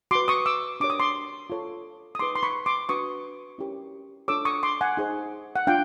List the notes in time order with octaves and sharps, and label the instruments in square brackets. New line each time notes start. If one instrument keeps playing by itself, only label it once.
[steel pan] F#4 B4 C6 D6
C#6 D#6
D6 E6
D4 G4 A#4 C#5 D6
D#6
C6 D6
F4 A4 C#5
D#6
D#4 G#4 B4 C6 D6
C6
B5 C#6
C6 D6
D4 F#4 B4 C#6 D#6
C#4 E4 G4 A#4 C#5
D4 F4 A4 C#5 D6 E6
C#6 D#6
C6 D6
F#5 G#5
D#4 G#4 C5
F#5
D4 F4 F5 G5